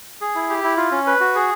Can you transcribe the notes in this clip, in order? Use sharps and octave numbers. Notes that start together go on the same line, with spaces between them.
G#4
E4
G4
E4
F4
C#4
B4
F#4
G#4